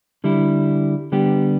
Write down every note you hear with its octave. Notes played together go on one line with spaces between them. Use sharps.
D3 G3 E4
D3 G3 B3 G4